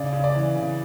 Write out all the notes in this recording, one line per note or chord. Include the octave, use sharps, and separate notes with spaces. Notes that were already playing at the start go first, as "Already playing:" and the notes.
Already playing: C#3 D5
C#3
D5
E3
C#3